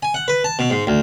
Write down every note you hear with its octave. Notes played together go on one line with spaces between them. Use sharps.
G#5
F#5
B4
A5
B2
G#2
D2